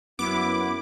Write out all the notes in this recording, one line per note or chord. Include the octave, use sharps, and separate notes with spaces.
F#2 B3 E4 D6